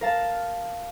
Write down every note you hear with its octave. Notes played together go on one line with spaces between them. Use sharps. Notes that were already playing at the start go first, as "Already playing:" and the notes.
A#4 F5 A5